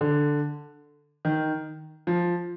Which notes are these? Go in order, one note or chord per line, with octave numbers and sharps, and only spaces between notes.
D3
D#3
F3